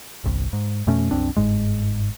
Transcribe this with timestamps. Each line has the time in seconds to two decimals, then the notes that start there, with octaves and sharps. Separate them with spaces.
0.24 G1 C2
0.53 G#2
0.87 F2 B2 A3 C#4
1.11 C2 F#2 C4 D4
1.36 G1 G#2 G#3